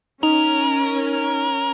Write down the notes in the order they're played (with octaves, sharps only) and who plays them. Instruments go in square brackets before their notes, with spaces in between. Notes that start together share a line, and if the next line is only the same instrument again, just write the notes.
[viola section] C#4 [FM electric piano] D#4 [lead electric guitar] A#4